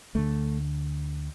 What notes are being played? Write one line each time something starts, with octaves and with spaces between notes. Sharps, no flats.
D2 D3 A3